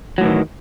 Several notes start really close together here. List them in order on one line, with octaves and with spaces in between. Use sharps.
F#3 A2 E3 D#3